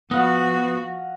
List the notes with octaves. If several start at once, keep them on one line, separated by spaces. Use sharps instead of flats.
F3 B3 F#4 D#5 F5 F#5